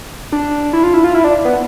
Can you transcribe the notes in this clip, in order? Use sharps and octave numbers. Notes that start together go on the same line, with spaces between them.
D4
E4
F4
E4
F4
E4
D4
B3